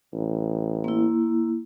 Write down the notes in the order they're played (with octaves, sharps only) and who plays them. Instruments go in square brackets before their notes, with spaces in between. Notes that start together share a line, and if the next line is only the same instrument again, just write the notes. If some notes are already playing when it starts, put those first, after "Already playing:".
[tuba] A1
[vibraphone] A#3 E4